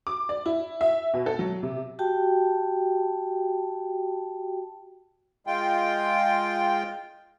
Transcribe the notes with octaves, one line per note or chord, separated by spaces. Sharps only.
D6
D5
E4
E5
B2
A4
F#3
C3
F#4 G4 G5 A5
G#3 F4 G5